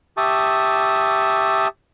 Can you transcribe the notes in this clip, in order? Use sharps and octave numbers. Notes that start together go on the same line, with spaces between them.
G4 E5 A5 C#6 D#6